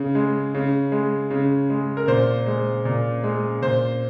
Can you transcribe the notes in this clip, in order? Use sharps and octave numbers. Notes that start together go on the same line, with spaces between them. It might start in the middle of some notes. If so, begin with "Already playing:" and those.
Already playing: C#3
G#3
C#3
G#3
C#3
G#3
A#4
A#2 C5
G#3
A#2
G#3
A#2 C5